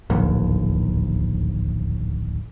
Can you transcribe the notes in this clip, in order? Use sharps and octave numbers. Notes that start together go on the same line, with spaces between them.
D1 A#1 D#2